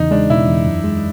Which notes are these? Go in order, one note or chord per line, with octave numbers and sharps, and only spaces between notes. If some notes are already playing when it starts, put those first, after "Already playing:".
Already playing: E2 C#3 D#4
G#3 D4
B2 E4
E2
F#2
G#3